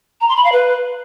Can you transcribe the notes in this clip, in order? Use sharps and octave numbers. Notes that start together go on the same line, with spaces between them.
A#5
C6
B5
F5
B4